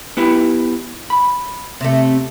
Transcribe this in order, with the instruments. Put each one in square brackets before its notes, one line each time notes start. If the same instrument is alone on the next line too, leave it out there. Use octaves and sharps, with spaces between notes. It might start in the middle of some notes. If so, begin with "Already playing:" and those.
[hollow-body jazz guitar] B3 E4 G4
B5
[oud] C3 A3